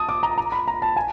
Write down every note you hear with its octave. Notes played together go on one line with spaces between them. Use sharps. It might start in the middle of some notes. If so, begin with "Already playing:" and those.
Already playing: A5 D#6
D6
A#5
A#5
B5
A#5
A5
G#5